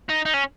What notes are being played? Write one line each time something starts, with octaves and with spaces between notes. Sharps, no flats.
D#4
D#4
C#4